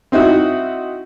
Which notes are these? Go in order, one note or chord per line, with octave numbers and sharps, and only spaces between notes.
C4 D#4 E4 F#4